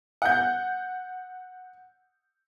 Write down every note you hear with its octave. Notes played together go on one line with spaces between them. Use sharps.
F#5 G6